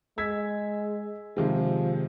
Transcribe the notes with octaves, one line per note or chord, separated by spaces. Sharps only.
G#3 E6 G#6 B6
C3 D#3 F3 G#3